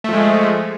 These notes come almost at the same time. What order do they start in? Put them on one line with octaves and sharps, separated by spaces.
A3 F3 G#3